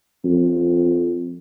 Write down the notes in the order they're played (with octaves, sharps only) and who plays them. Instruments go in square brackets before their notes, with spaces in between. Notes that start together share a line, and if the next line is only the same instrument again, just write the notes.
[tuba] F2